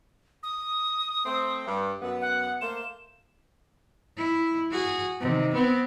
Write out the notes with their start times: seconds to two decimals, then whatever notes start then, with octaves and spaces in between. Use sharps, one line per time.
0.43 D#6
1.25 A3 C4
1.65 G2
2.00 F#2 B3
2.21 F#5
2.61 A3 A#3 C5 E7
4.17 E4
4.71 F#4 G#4
5.21 C3 D#3
5.54 B3 C4